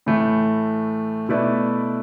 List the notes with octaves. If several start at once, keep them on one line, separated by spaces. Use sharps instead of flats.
A2 E3 A3
B2 A3 E4 B4 D5